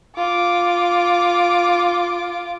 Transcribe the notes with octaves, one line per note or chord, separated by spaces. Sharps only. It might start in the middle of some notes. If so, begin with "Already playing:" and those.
F4 D6